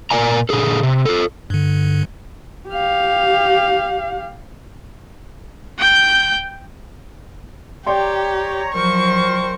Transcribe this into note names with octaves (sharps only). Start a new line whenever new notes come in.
A#2 A#4 D5 G#5 A#5
A#2 D3 G#4 A4
C3
F4 A4
G2 D3
G4 F5
G5 G6
G4 C#5 D5 G5 A#5 C6
F3 F#3 A#4 C5 C#6